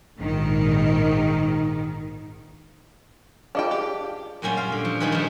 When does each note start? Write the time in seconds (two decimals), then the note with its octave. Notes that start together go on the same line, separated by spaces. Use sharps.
0.17 A#1 G#2 D#3
3.55 D4 F4 G#4 D#5 F5 G5
3.71 G4
4.42 F#2 A#2 G3 C#4 F4
4.57 F5
4.72 D3
4.85 F3
5.00 D#3 G3 D#4 G#4 B4
5.12 G2 F3